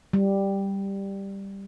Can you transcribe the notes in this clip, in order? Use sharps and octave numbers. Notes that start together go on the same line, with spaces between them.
G3